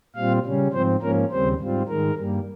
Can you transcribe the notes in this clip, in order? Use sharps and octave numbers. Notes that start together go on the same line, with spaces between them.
A#2 G3 C4 F4 F5
C#3 G3 C#4
G#2 F3 C4 C5
G#2 F3 A#3 C#4 A#4
D#2 C#3 G3 C4 C5
G#2 G3 C4 F4
G#2 D#3 G#3 A#4
G2 G3 A#3